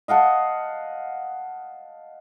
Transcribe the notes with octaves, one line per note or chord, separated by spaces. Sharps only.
D#5 F5 F#5 A5